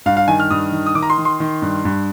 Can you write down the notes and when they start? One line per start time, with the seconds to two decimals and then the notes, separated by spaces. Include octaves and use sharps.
0.06 G2 F5
0.17 F5
0.28 D#3 G#5
0.40 F6
0.50 G2 D#6
0.72 D#3
0.86 D#6
0.95 D#3 D6
1.03 A#5
1.10 C6
1.18 D#3
1.25 C6
1.40 D#3
1.62 G2
1.85 G2